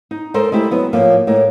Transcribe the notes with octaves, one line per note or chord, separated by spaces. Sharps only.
D#4
G#3 A4 A#4 C5
G#3 A3 E4 G4
F#3 B3
A2 F3 A#3 F4
A2 G#3 A#3